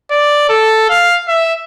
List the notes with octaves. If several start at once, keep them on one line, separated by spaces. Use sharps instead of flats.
D5
A4
F5
E5